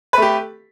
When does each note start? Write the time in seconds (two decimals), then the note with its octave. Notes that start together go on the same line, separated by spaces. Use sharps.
0.13 B4
0.18 A3
0.22 G4